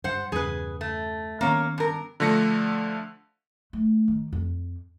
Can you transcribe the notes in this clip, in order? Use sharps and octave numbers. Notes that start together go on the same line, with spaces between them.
G2 C5 F#5
E2 G2 C#3 G#4 B4
A3
D#3 A#3 B3 C#4 C#5
G2 A#4
D3 F3 A3 A#6 C#7
A3
D#3
F2